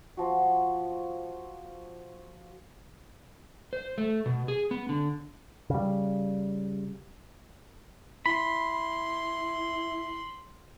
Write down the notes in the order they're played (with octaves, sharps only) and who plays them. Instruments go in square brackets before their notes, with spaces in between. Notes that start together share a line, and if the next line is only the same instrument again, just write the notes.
[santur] F3 F#4
[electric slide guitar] C5
A3
B2
G#4
B3
D3
[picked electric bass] C#3 G3
[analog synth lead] E4 [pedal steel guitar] B5 [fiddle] C6